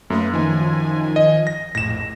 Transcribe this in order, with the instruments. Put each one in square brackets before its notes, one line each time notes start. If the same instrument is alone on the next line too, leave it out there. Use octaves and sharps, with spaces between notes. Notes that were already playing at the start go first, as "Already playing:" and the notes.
[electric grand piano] F#2 [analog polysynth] A3 A#3 B4
[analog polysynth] D#3 F3 G#5
[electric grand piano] D#5
A#6
[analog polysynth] A#1 F2 A2 [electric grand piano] A#6 E7